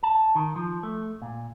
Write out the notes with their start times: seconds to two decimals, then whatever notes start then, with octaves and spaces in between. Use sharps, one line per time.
0.03 A5
0.35 D#3
0.56 F3
0.83 A3
1.22 A#2